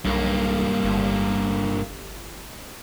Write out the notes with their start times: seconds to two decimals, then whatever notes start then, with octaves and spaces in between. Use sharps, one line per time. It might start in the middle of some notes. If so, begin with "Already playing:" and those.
0.05 B1 G2 A#3
0.84 G1